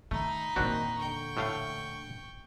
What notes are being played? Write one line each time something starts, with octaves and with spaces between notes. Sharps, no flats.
D#3 A3 D#4 B5
E2 A#2 D#3 C4 D4 F#4
D3 G5 C#6
A2 A3 F5